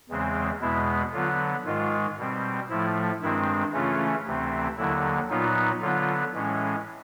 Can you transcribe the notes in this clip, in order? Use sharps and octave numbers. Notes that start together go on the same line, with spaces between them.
E2 C#3 E3 G#3 C4
E2 B2 G#3 B3 E4
D3 F#3 B3 F4
G#2 D#3 G#3 F4
B2 G3 C4
A2 F3 A3 E4
G2 D#3 G#3 C4 E4
C#3 E3 A3 C#4 F4
D2 C3 E3 A3 C4
D#2 D3 F#3 E4
A#2 F#3 B3 D#4 F4
D3 F#3 B3 F4
A2 E3 G#3 C#4